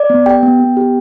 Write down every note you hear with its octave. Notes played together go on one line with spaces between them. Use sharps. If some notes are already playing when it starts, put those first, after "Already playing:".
Already playing: D5
B3
G4 G5
B3
B3
G4